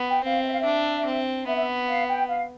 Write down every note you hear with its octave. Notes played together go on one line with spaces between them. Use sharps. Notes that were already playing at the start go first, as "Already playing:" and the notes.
Already playing: B3
G5
C4 F5
E5
F5
D4 E5
C4
B3 E5
E5
F5
G5
F5